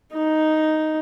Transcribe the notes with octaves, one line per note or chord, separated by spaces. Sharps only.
D#4